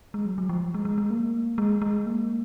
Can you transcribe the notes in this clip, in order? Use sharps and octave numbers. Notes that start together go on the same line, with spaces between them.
G#3
F#3
F#3
F3
G#3
G#3
G#3
A#3
G#3
G#3
A#3